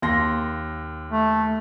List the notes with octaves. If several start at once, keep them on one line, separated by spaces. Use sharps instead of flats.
D#2 C6 A#6
A3